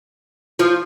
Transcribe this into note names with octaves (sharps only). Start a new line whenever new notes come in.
F3 F4